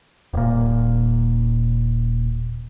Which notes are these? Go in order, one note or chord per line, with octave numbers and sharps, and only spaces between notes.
D#1 A#2